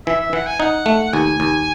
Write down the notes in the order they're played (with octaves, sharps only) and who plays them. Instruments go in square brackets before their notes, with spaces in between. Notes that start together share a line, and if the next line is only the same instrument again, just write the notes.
[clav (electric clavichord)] E3 [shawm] E5
[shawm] E5
[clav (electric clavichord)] E3 [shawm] F#5
[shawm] G#5
[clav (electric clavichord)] D#4 [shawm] F#5
[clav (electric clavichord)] A3
[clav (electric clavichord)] D#2 [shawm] G#5
[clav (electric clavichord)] D#2